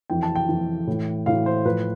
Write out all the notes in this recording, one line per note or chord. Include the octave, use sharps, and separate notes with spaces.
F2 E3 G5
A5
G5
F2 E3
A2 E3
A2 E3 F5
C5
A2 F3 B4